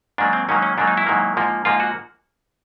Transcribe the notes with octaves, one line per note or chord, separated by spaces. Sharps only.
G#2 D#3 F#3 A#3 D4
C4
G#2 D#3 F#3 A#3 C#4
C#4
G#2 D#3 F#3 A#3 D4
D#4
E4
G#2 D#3 F#3 A#3
G#2 F3 A#3
G#2 F3 A#3 F4
F#4